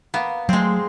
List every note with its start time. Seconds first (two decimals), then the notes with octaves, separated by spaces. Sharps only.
0.14 A#3 B3
0.49 F#3 G#3 A3 C4